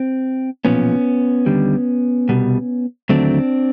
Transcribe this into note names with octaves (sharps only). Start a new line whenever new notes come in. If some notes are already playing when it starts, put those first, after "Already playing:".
Already playing: C4
B1 A#2 F3 B3 C#4
D#2 D3 G3
C2 B2 G3
D#2 D3 F#3 A3 C4 D4